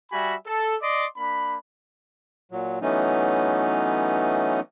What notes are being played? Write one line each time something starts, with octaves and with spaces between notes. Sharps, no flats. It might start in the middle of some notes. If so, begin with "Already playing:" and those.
G3 F#4 E5 G#5 B5
A4
D5 D#5 C6 D6 D#6
A#3 D4 B5
A#2 F#3
E3 F#3 A3 B3 C#4 D#4